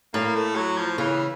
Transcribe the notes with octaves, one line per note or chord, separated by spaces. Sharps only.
A2 A#3
A3
F#3
F3
C#3 E3